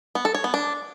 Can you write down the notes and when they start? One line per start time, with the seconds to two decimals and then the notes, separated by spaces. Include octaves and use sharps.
0.15 B3
0.25 A4
0.35 C#5
0.44 B3
0.54 D4